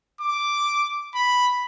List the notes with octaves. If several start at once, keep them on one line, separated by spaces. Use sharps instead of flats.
D6
B5